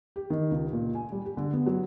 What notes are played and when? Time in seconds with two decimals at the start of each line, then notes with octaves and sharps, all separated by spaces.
0.16 G4
0.30 D#3
0.51 C#2
0.73 A#2
0.95 G#5
1.12 G3
1.25 G4
1.37 D3
1.53 B3
1.66 F#3